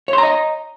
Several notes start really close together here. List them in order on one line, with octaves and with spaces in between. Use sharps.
C#5 C6 A#5 D#5